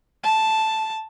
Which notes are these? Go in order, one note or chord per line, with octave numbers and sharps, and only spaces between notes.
A5